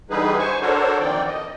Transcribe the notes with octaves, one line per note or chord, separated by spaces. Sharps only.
D3 E3 G3 D#4 G#4 B4
C5 G#5 C#6
D4 F#4 A4 A#4 C5 C#5
F2 A#2 D#3 E3 D5 G5
D#5